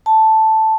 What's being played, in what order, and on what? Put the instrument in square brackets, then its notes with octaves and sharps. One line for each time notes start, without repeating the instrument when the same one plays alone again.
[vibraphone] A5